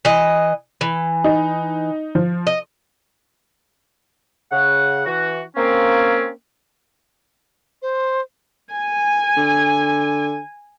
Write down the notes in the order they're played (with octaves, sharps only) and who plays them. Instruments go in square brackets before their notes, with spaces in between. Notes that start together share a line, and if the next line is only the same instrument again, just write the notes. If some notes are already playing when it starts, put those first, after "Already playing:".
[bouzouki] E3 D#5
E3
[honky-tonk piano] D#4
F3
[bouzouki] D#5
[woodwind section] C#3 F#5
E3 F#4
A#3 C4 C#4
[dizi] C5
[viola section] G#5
[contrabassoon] D3